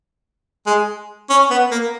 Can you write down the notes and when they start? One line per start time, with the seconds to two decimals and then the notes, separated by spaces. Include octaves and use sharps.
0.67 G#3
1.30 C#4
1.50 B3
1.71 A#3